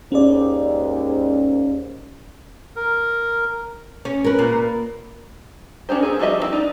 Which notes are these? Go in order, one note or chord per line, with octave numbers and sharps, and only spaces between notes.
D#2 G#2 C#4 D5
A#4
C#4
A#4 B4
A#2
C#4 D4 G4 C5
C4 G#4 A#4
F3 G3 F#4 D#5 E5
G3 C4 E4
D4 D#4 F4